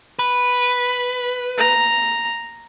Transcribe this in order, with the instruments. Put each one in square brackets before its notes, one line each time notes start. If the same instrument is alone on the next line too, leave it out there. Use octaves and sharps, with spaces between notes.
[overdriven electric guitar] B4
[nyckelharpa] A#5